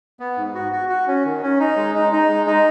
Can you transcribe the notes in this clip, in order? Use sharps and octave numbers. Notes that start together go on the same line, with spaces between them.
B3
G#2
F#4
F#4
F#4
C#4
D#3
C#4
D#4
G#3
D#4
D#4
G#3
D#4